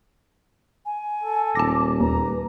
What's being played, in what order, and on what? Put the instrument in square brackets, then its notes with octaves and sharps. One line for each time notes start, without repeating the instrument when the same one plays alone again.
[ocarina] G#5
[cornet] A4
[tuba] D#1 [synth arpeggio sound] A5 A#6 [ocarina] D6
[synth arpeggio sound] D#2 [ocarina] B4 [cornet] A#5